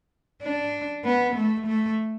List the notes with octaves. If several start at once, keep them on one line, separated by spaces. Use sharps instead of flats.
D4
B3
A3
A3